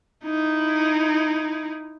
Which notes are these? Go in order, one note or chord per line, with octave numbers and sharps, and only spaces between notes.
D#4 E4